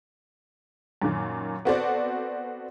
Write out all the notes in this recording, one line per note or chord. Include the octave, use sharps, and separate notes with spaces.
F#2 A#2 D#3
B3 C4 F#4 A4 C5 D5